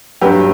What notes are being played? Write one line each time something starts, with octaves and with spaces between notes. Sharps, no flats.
G2 F#3 G4 B4